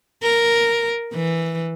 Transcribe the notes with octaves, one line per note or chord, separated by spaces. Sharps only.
A#4
E3